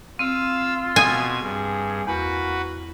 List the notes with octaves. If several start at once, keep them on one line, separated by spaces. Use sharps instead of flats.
C4 F4 F5 E6
B2 G#5 C6 D#6 E6 G#6
G2 G#4
E2 A#3 F#4 B4